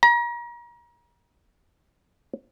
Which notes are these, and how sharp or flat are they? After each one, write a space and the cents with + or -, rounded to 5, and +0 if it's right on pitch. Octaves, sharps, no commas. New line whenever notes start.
A#5 +35